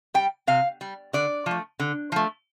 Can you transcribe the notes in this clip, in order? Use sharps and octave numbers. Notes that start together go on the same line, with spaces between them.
G3 G5
C3 F5
G3
D3 D5
F3 A3
D3
F3 A3